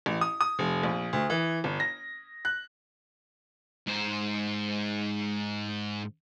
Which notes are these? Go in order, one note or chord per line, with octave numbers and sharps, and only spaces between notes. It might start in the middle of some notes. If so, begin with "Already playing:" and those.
A1
D#6
D#6
F1
A#1
D2
E3
G1
A#6
F#6
G#2 C5